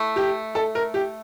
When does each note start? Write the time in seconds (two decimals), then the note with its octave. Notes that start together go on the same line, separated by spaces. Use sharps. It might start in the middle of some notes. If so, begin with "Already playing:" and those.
Already playing: A3 E4
0.16 G4
0.55 A4
0.75 A#4
0.94 G4